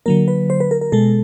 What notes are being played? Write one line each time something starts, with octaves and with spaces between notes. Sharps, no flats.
D3 F#3 A#3 A#4
B4
C5
B4
A#4
A#4
B2 G#3 A4